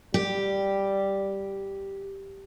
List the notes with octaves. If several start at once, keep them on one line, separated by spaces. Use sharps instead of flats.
G3 G4